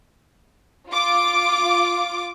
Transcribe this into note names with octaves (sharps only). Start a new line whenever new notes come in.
F4 D6